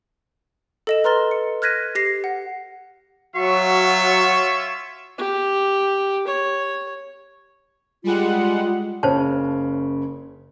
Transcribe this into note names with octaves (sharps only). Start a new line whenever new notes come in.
A4 D#5 E7
B4 A#5 C6 F6 A6 G7
C#7
F6 F#6 G#6 A#6 B6 D#7
G4 A#6 C7
F#5
F#3 F4 F#4 C#5 E5 C#6
G4
C#5
G3 G#3 F4 F#5
F#1 C#3 C5 C#5 A5